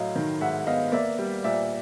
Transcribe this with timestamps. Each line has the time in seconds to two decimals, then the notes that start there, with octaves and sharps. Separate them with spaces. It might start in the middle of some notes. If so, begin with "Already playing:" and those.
Already playing: A2 F#3 D#5 F5
0.15 D#3
0.41 G#2 E5 F#5
0.67 B3 D#5 F5
0.92 A#3 D5 E5
1.19 G3
1.44 A#2 D5 E5